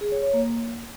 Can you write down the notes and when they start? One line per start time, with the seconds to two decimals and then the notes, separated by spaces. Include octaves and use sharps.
0.01 G#4
0.12 C#5
0.23 C#5
0.34 A#3